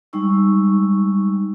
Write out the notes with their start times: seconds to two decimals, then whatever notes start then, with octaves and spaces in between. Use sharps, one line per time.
0.13 G3 G#3 D#4 C#6 E6